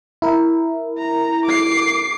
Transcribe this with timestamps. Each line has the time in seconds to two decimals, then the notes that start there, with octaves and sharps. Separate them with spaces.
0.22 E4 A#4
0.99 A#5
1.46 D6 C7